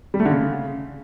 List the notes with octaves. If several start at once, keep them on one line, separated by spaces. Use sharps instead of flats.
G3
A3
D3
C#3